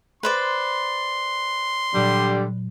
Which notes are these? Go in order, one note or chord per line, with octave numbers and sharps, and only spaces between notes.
B4 C5 D5 C6
A#2 D3 F#3 G3